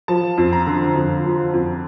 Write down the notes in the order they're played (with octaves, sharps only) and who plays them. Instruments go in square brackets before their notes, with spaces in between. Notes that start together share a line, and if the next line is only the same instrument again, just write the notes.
[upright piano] F3 A5
F2
A#5
D3
F2
F3
F2